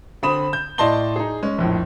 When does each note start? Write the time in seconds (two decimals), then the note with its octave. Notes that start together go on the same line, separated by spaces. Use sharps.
0.23 D3 C4 B5 D#6 E7
0.53 G6
0.78 A2 D5 D#5 A5 C6 G7
1.16 D#4 G#4
1.43 G#3 C#4
1.58 A#1 F2 A2